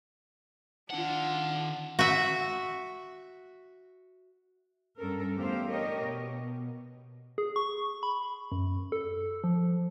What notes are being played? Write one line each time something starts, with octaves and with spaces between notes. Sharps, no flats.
D#3 D4 F4 F#5
F#4 E5
G2 C#4 A4 A#4
E2 A3 G4 C5 F5
D4 G4 A#4 C#5 D#5
B2
G#4
C#6
B5
F#2
A4
F3